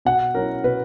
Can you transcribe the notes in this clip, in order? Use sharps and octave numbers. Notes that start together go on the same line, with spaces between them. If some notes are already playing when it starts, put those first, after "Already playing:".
B2 F#5
F#3 C#4 E4 A#4
B2 B4